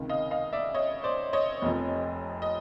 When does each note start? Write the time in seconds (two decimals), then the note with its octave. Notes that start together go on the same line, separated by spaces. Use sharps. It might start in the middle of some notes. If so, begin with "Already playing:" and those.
Already playing: C#2 C3 D#3
0.09 D#5 F5
0.31 D#5 F5
0.53 D5 E5
0.74 C#5 D#5
1.04 C5 D5
1.33 C#5 D#5
1.62 F1 F2 C3 F3
2.42 D#5